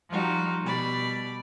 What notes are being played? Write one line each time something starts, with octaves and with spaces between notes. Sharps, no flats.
F3 G3 D#4 F4 F#4
B2 G3 D5 B5